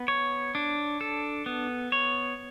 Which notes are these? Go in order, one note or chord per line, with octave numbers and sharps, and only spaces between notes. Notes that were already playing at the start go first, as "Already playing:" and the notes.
Already playing: B3
C#5
D4
A4
B3
C#5